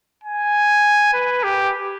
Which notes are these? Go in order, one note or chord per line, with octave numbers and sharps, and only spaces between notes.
G#5
B4
G4